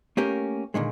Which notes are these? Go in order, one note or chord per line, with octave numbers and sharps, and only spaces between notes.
A3 A#3 C#4 G4 A#4
A#2 D3 D#3 G#3